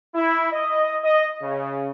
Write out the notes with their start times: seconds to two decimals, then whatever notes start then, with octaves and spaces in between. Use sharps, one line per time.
0.15 E4
0.52 D#5
1.04 D#5
1.42 C#3